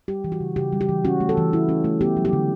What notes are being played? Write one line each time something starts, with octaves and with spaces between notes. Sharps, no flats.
G3 G4
E3
F#4
C#3
C#3 G4
G3
G4
E3
C#4 F#4
A3
A4
E3
E4
C#4
A3
B3 G4
F#3
G4
D3